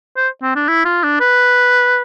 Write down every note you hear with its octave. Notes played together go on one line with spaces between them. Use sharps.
C5
C4
D4
E4
F4
D4
B4